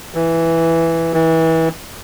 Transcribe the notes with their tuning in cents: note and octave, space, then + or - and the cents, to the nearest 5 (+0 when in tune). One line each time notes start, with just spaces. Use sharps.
E3 +0
E3 -25